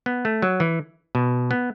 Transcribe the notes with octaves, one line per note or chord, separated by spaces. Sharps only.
B3
A3
F#3
E3
B2
B3